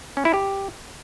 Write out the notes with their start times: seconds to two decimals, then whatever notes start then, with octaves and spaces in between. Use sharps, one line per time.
0.17 C#4
0.25 E4
0.34 G4